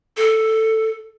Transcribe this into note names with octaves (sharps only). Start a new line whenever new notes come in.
A4